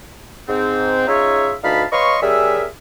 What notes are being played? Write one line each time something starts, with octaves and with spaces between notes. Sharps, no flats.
G#2 C4
C#4 D#4 F4 G#4 C#5 E5
D2 E3 D#4 F5 A5 B5
B4 C#5 D#5 F5 C6 C#6
G3 C#4 G#4 A#4 E5